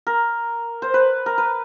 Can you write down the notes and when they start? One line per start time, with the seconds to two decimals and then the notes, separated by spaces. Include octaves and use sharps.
0.07 A#4
0.82 C5
0.94 B4
1.26 A#4
1.38 B4